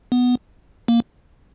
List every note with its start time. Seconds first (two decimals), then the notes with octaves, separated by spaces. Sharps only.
0.12 B3
0.88 A#3